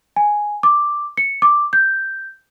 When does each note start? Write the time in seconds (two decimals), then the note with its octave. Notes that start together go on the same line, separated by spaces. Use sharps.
0.16 G#5
0.63 D6
1.17 C#7
1.42 D6
1.73 G6